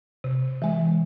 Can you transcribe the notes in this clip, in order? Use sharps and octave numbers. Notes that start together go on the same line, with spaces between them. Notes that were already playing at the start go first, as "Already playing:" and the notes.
C3
E3 G#3